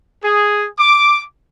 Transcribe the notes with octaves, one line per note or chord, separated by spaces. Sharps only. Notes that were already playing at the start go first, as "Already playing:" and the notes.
G#4
D6